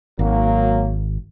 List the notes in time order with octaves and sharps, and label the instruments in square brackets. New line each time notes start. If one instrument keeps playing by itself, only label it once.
[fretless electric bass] G#1 [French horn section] F#3 A#3